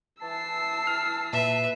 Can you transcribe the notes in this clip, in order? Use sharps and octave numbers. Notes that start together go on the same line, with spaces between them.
E3 A5 E6 C7
F6
A#2 B4 E5